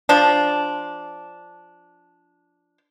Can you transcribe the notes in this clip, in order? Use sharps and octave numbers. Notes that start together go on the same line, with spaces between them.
F3 D4